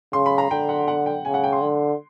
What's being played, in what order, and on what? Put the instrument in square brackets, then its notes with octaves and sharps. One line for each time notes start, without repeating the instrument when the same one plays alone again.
[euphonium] C#3 [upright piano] C6
[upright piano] B5
A#5
[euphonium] D3 [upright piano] G5
[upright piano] F#5
F#5
G5
[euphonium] C#3 [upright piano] G#5
[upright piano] F#5
G5
C6
[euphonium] D3